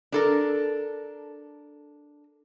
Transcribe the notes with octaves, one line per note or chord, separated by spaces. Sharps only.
D4 A4 A#4